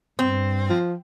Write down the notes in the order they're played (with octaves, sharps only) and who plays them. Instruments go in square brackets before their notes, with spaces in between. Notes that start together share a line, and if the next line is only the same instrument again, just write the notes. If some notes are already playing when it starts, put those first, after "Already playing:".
[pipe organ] G2 [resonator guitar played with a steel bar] C4
[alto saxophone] F3